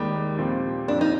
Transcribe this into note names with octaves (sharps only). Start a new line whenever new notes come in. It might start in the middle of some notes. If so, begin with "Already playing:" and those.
Already playing: D#2 D#3 G3 G#3
A#2 F3 C4
F2 C3 F3 D4
D#4